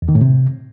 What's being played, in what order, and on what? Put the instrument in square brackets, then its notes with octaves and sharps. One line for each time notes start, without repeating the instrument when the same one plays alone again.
[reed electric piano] E2
D#3
A2
C3